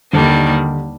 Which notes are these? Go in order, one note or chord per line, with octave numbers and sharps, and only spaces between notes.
D#2 D3 D#3 G3 D4